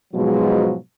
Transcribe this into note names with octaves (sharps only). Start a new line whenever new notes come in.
G#2 B2 F3 F#3 G#3